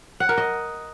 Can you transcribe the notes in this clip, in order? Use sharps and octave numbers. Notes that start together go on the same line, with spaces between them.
F#5
A#4
D#5